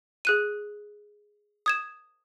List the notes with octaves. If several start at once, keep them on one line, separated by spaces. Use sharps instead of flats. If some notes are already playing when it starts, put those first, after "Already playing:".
G#4 F#6 D#7
D#6 G#6 E7